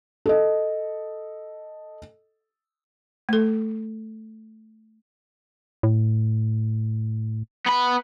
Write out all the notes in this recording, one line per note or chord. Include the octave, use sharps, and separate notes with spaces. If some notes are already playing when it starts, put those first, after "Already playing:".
A4 D#5
A3 A4
A2
B3 B5